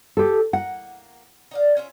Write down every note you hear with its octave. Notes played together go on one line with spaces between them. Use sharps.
G4 A4
A#3 F#5
D#4 D5 F5
C#4 F4 E5